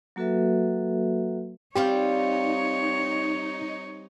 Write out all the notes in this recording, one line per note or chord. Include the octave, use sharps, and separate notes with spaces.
F#3 A#3 F#4 A4 B4 E5
G3 C4 D#4 F4 G4 C#5